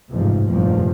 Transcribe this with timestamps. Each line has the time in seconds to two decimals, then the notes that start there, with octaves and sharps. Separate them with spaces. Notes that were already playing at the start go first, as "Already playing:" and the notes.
0.11 A1 F2 G#2 C3 F3
0.45 F1 E2 G2 A#2 F3